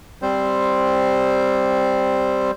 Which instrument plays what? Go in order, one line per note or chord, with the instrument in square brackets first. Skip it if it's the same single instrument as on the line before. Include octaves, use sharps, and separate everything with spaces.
[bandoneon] G3 C4 C5